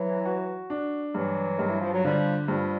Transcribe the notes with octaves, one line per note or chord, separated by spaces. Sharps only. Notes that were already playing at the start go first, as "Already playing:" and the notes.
Already playing: E3 F#3
F#4
D4
G2 E3 F#3
G2 D#3
E3
F3
F#3
D3 F3 G3
G2 F3 G3